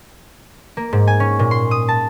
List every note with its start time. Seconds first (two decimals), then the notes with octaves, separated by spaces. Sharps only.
0.77 A#3
0.93 G#2
1.07 G#5
1.20 C#4
1.39 A#2
1.51 C6
1.71 D#6
1.89 A5